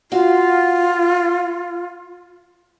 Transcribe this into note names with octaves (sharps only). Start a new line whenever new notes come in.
F4 F#4 F5